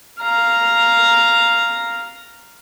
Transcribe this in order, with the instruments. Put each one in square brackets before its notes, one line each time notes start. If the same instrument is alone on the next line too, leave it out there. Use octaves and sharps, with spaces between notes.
[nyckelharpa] F5 A#5